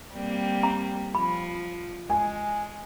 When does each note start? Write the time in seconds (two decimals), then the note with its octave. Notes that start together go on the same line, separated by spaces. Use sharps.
0.14 G3 A#3 C4
0.63 A#5
1.15 F3 B5
2.10 G#3 G#5